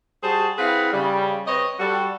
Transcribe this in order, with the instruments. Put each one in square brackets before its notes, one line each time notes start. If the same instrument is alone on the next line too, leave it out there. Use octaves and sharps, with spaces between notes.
[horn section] G3 F#4 G#4 C5 A5
C4 E4 G#4 B4 F5 F#5
C#3 G3
C4 B4 C#5 D#5
G3 F#4 A4